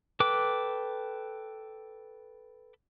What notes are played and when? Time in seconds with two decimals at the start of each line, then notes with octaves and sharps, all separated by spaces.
0.20 A4 B4 G5 D6